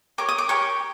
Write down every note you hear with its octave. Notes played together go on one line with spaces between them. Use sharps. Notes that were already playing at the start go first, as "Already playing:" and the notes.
G4 A#4 C#5 D6
D#6
D6
G4 A#4 C#5 C#6